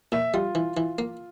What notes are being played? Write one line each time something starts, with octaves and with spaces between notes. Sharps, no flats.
A#2 E5
G3 F4
E3
E3
A#3